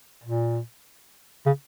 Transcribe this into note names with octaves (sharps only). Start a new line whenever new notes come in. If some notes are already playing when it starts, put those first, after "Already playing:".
A#2
C#3